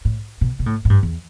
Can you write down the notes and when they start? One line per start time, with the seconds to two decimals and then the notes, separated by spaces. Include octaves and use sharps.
0.05 A2
0.41 B2
0.59 B2
0.66 A2
0.85 A2
0.90 G2
1.03 E2